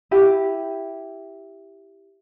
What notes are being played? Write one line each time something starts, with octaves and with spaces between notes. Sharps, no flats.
E4 G4